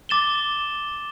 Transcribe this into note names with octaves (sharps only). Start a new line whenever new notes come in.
D6 A6 E7 G7